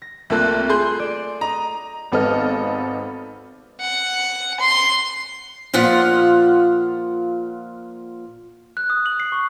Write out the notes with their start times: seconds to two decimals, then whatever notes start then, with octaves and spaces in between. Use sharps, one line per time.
0.02 A#6
0.30 C2 A3 A#3 F4 A4 F#6
0.69 G#4 C6 G6
1.00 D5 E7
1.41 D#5 A#5
2.12 G#1 B3 A4 D#5 F6
3.80 F#5
4.60 C6
5.74 A#2 F3 F4 F#5
8.77 F#6
8.90 D#6
9.06 F#7
9.20 C7
9.32 C#6